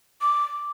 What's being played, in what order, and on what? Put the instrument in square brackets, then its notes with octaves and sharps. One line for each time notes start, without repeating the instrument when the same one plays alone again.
[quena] D6